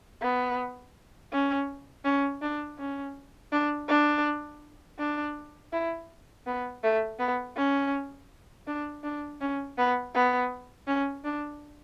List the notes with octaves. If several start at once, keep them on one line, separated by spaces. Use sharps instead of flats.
B3
C#4
C#4
D4
C#4
D4
D4
D4
E4
B3
A3
B3
C#4
D4
D4
C#4
B3
B3
C#4
D4